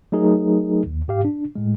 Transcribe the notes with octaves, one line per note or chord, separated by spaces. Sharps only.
F#3 A3 D#4 G#4 A#4
D#2
G#2 G4 F5
D4
A2 G#3